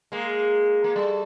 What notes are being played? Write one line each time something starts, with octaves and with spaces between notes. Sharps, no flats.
G#3 A#3
A#3
G3 A3